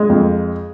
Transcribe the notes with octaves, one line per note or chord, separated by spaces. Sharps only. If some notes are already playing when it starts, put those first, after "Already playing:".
Already playing: G#3
F2